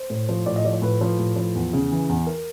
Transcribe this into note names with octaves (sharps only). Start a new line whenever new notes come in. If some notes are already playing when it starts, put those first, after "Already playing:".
Already playing: C5
A2
F3
A2 D5
D#5
F3 D5
C#5
A2 B4
F3
A2
F3
E2
C#3
E3
E2
A#4